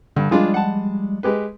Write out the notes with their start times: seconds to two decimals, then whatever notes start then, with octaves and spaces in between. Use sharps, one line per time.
0.16 G2 D3
0.31 F3 G3 G#3 D4 F4 G#4
0.54 F#5 A5
1.23 G#3 G4 B4